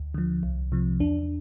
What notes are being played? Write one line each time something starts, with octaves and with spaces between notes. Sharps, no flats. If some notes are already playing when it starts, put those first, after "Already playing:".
Already playing: D2
D3 F3
C2
C3 F3
E2 D4